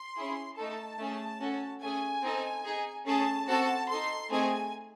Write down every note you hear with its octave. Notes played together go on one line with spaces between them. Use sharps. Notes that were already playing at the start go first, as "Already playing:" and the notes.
Already playing: C6
C#4 E4 G#4
A3 D#4 A4 A5
A3 C#4 G#4
C#4 F#4 A4
A3 C#4 G#4 G#5
C4 D#4 A4
D#4 G#4
A3 C#4 G#4 A5
C4 F#4 A4 A5
D#4 A4 C6
A3 C4 D#4 G#4 G#5